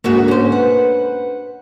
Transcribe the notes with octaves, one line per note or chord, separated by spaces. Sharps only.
D2 G#2 A#3 F#4
C#4 C5
B4 F#5